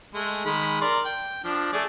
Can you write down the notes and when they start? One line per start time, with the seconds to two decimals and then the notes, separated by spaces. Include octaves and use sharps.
0.14 G#3 A3
0.45 D#3 G#3 B5
0.81 A#4 D5 C6
1.05 G5
1.44 F3 D4
1.73 A3 G#4 D5